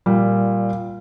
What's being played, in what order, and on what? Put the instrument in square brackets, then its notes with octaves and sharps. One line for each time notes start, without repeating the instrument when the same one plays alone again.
[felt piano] A#2 G3